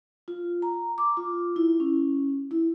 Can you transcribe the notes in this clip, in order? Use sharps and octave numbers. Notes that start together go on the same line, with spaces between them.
F4
A#5
D6
F4
E4
C#4
E4